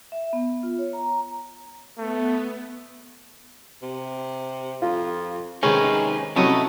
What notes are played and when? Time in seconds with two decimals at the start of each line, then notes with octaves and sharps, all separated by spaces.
0.12 E5
0.33 B3
0.50 B3
0.63 F4
0.79 C#5
0.93 A#5
1.98 A3 B3
3.82 C3
4.82 F2 F4
5.63 C3 D#3 G#3 C#4 D#4 G#4 B4
6.36 C3 F#3 A3 C#4 E4 G4 C#5 D#5